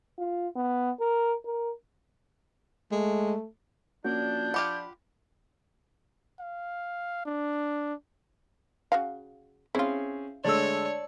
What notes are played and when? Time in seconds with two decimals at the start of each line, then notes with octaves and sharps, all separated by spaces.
0.18 F4
0.56 B3
1.00 A#4
1.45 A#4
2.92 G#3 A3
4.05 F3 A#3 C#4 D4 F#4 G6
4.54 F4 G4 F#5 B5
6.40 F5
7.26 D4
8.92 C#3 F#4 F5
9.75 C4 C#4 E4 F4 G#4
10.45 D3 G#3 A3 C#5 D5 A5 E6